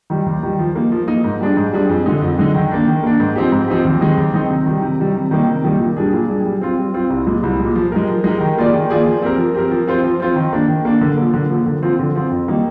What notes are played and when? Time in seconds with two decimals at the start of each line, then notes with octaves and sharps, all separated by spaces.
0.10 D#3 G3
0.26 D#2
0.43 D#3 G3
0.59 F3
0.76 A#3 D#4
0.92 F3
1.08 A#3 D#4
1.24 G#2
1.40 G3 D4 G#4
1.57 G#2
1.73 G3 D4 G#4
1.89 F2
2.06 D3 G#3 D#4
2.22 F2
2.38 D3 G#3 D#4
2.54 D#3
2.71 A#3 D4
2.87 D#3
3.03 A#3 D4
3.20 G#2
3.36 F3 C4 D#4 G4
3.52 G#2
3.68 F3 C4 D#4 G4
3.85 D#2
4.01 D#3 G#3 C4 D#4
4.17 D#2
4.34 D#3 G#3 C4 D#4
4.50 C3
4.66 D#3 G3
4.82 C3
4.99 D#3 G3
5.15 C3
5.31 D#3 G3 A#3 D#4
5.48 C3
5.64 D#3 G3 A#3 D#4
5.80 A#2
5.97 G3 D4 G#4
6.13 A#2
6.28 G3 D4 G#4
6.45 G3
6.61 C4 F4
6.78 G3
6.94 C4 F4
7.10 C2
7.27 A#2 G#3
7.43 C2
7.59 A#2 G#3
7.75 F3
7.92 G#3 D#4 G4 A#4
8.08 F3
8.24 G#3 D#4 G4 A#4
8.41 D#3
8.57 A#3 F4 G#4 D5
8.73 D#3
8.90 A#3 F4 G#4 D5
9.06 F3
9.22 C4 G4 A#4
9.38 F3
9.55 C4 G4 A#4
9.71 F3
9.87 C4 F4 C5
10.04 F3
10.20 C4 F4 C5
10.36 D#3
10.53 A#3 D4
10.68 D#3
10.85 A#3 D4
11.01 D3
11.18 F3 A#3
11.34 D3
11.50 F3 A#3
11.66 D3
11.83 F3 C4 F4
11.99 D3
12.15 F3 C4 F4
12.31 F2
12.48 D#3 G3 A#3 D#4